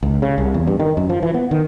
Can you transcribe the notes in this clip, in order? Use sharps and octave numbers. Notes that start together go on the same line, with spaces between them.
C#2
C#3
C2
E2
G2
D#3
F#2
F3
E3
B3
D#3